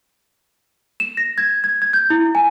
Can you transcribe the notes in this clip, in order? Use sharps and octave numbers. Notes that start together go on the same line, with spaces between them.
E7
A#6
G#6
G#6
G#6
G6
E4
G#5